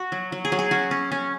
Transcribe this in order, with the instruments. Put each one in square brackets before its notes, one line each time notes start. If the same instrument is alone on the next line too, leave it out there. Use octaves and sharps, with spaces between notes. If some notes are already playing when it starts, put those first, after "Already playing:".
Already playing: [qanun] F#4
F#3
F#3
G#4
F#3
G#4
C#4 F#4
C#4
C#4